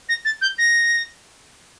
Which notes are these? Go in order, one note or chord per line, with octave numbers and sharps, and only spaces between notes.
A#6
A6
G6
A#6